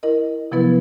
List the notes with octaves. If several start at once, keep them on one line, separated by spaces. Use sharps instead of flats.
E4 A#4 D#5
C3 F3 F#3 B3 E4 B4